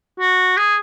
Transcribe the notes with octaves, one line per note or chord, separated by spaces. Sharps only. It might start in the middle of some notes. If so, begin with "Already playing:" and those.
F#4
G#4